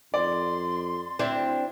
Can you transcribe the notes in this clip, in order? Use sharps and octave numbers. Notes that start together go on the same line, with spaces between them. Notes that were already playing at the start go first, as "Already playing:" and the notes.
F2 D5 C6
D2 C4 D4 E4